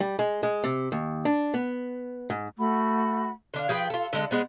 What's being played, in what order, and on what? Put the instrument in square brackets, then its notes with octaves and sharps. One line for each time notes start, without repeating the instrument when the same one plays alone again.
[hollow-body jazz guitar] G3
G#3
G#3
C3
D#2
D4
B3
G#2
[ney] A3 [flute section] F#4 F#5 B5
[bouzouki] D3 D4 F5
F3 G#4 B4 G5
F4 A4
D3 G#3 A4
G#3 B3 C4